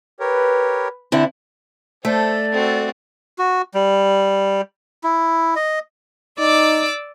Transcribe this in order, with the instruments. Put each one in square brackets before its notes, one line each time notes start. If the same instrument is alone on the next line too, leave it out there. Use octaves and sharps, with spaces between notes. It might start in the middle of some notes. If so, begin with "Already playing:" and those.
[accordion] G4 A#4 C#5 [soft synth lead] B4
[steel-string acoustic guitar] D3 C4 E4
[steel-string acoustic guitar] A3 [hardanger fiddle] A4 [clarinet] C5 [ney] D5
[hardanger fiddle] C4 F#4 [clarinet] A4
[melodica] F#4
G3
E4
D#5
[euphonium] D#4 [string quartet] D5 D6 E6